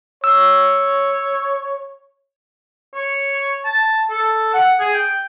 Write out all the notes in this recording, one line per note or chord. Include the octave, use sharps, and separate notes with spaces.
C#5 E6
C#5
A5
A4
F#5
G#4
G5